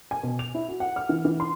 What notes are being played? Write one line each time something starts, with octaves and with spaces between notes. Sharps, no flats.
G#5
B2
F7
E4
F#4
F#5
F6
E3
E3
C6